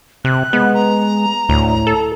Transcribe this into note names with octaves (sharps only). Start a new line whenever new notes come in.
C3 F#6
G#3 B3
A#5
D2 A2
A4